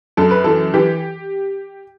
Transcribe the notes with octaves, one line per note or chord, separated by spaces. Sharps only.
F#2 A4
B4
E3 A4
E3 G4